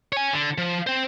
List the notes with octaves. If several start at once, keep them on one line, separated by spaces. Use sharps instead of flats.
C#5 G#5
D3
F3
C4 C5